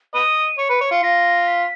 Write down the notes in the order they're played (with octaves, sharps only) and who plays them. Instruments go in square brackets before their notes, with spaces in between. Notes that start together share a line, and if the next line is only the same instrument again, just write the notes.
[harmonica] B4 D#5 [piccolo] D#7
[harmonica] C#5 [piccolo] C#7
[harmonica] B4
C#5
F4
[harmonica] F4 [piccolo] A#6
[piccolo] B6